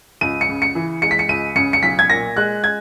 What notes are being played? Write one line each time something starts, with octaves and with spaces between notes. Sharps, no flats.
C#2 D#7
C#7
C#3
C#7
E3
G#3 C#7
B6
C#7
C#2 D#7
C#3 C#7
C#7
B1 B6
G#6
A#2 A#6
G#3 F#6
G#6